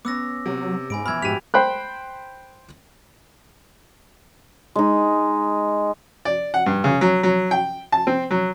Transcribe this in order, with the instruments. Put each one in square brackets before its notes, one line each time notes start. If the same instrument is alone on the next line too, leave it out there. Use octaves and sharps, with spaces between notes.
[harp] B3 C#4 [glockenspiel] D6 E6 A#6
[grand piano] C3 [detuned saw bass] F#3
[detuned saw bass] G#2 [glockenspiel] G#5 B5 D7
[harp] B2 E3 F3 [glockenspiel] B5 G#6 [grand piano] E6 F6
[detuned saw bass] G#2 [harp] F3 F#4 G4 [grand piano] B6 D#7 [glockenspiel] F7
[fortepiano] C5 G5 B5 F#6
[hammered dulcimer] G#3 D#4
[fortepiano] D5
F#5
G2
C#3
F#3
F#3
G5
A5
C4
F#3